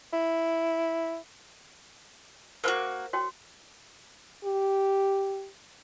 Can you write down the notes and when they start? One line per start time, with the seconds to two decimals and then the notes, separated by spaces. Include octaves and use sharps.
0.13 E4
2.64 A#3 E4 F#4 A#4 C5 F#5
3.13 F#4 C#5 G5
4.45 G4